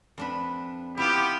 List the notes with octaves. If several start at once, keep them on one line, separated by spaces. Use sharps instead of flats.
F2 D4 B4
B3 E4 F4 G4 F5